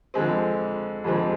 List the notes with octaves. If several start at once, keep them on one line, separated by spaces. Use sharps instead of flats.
F2 D3 G#3 C4
F2 D3 G#3 C4